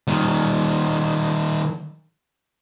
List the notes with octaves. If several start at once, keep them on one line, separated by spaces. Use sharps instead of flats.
D#3 G3